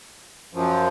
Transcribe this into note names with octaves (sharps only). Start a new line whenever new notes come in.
F#2 F3